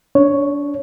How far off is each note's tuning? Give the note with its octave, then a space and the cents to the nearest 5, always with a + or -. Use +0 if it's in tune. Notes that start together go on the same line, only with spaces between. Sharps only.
D4 -30 C#5 +0